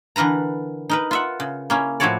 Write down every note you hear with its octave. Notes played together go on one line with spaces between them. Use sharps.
D3 E3 A#4 B4 A#5
D#4 A#4 B4
F4 E5 F#5
C#3
A#3 C#4 E4
A2 F3 E4 F#4 C#5 D5